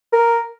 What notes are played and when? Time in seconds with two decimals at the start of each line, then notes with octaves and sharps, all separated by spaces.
0.13 A#4